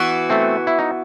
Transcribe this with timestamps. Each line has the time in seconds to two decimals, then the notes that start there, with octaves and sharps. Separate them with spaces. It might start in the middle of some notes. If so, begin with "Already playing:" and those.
Already playing: E3 B3 F#4
0.30 A3 C4
0.67 E4
0.79 D#4